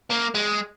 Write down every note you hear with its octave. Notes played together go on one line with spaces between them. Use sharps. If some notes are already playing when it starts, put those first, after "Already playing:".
A#3
G#3